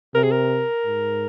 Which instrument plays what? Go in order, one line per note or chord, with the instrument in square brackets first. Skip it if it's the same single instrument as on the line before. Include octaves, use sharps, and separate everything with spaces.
[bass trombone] C3 [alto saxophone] A#4
[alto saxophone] G#4
A#4
[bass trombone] G#2